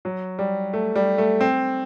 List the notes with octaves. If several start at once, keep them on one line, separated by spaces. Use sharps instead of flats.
F#3
G3
A3
G3
A3
C4